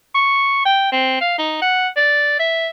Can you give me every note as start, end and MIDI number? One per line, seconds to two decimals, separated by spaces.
0.15 0.65 85
0.65 0.92 79
0.92 1.21 60
1.21 1.35 77
1.38 1.59 63
1.62 1.88 78
1.96 2.36 74
2.39 2.69 76